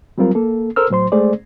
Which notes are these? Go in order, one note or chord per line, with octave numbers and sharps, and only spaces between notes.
F#3 G3 C4 F4 A#4
A#3 A4
A4 A#4 C5 E6 F6
A2 F#3 C5 C6
G#3 A3 G#4 C5 D5